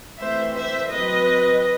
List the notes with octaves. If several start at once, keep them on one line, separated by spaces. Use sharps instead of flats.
E3 A3 C4 C5 E5
C5 E5
F#3 C4 B4 D#5